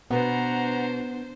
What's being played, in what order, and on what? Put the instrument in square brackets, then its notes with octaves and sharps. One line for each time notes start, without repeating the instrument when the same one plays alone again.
[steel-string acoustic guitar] B2 [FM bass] B3 [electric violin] D4 C5 [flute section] F#5 A#5